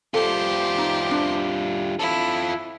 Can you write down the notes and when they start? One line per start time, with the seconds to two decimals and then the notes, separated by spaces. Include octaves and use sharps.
0.14 G3 F4 G4 A4 C5
0.78 D#4
1.11 D4
1.99 E4 F4 A4